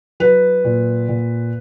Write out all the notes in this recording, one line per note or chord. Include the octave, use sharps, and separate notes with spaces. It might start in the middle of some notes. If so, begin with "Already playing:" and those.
F#3 B4
A#2
A#2